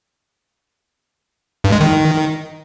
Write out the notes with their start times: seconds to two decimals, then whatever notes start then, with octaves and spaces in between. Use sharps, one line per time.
1.64 G2
1.72 G#3
1.80 D#3